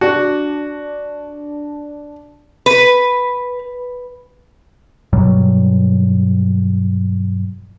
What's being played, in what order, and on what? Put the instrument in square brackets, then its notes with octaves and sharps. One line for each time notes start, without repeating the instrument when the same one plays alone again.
[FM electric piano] D4 D5 A5 [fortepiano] F#4
[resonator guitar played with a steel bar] B4
[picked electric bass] G2 B2 F#3 G3